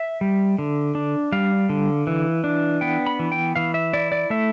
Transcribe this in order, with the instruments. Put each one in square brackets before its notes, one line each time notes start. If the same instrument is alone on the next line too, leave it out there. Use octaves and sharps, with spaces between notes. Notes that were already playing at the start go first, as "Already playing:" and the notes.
Already playing: [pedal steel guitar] E5
G3
D3
D4
G3 F5
D3
E3
D4
B3 G5
B5
E3
G5
E3 F5
E5
E4 D5
D5
A3 E5